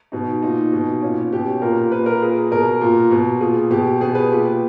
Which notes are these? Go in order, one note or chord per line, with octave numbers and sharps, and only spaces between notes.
B2 D#4
A#2 D#4
B2
A#2 C#4
B2 G4
A#2 A#4
A#2 B4
A#4
A#2 G#4
B2 A#4
A#2
B2
A#2 G#4
B2 G4
B2 G#4
B4
A#2 G4